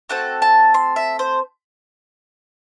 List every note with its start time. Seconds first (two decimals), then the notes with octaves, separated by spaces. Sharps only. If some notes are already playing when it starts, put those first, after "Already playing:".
0.09 A3 C4 F#4 A4 F#5
0.42 A5
0.74 C6
0.96 E5
1.19 C5